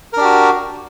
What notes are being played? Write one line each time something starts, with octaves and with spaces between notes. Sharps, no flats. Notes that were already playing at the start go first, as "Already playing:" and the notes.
D4 F#4 G4 A#4